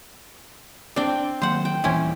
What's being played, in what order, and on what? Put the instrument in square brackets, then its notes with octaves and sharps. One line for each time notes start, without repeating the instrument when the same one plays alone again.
[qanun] C4 G5 [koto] D4
[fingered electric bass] D#3 F#3 A#3 [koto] C5 F#5
[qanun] G5
[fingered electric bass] D#1 [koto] E3 C4 C#4